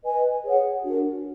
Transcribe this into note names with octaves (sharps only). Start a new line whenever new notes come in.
B4 D#5 G#5
G#4 C#5 F#5
D4 F#4 A#4